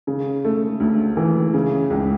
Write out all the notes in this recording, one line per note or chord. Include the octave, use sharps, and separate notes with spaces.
C#3
A3
D2
E3
C#3
C#2